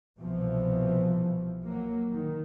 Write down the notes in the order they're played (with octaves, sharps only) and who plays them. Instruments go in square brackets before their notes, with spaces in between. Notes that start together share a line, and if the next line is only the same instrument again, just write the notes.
[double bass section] C2 B2 E3 F3
F#3 A#3
D#3